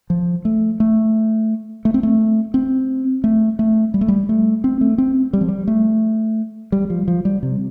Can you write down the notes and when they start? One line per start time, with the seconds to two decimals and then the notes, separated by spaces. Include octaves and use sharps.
0.10 F3
0.45 A3
0.80 A3
1.85 A3
1.94 C4
2.03 A3
2.54 C4
3.24 A3
3.59 A3
3.94 G3
4.01 A3
4.08 G3
4.29 A3
4.64 C4
4.81 A3
4.98 C4
5.33 G3
5.41 F3
5.48 G3
5.68 A3
6.72 G3
6.90 F3
7.08 F3
7.25 G3
7.43 C3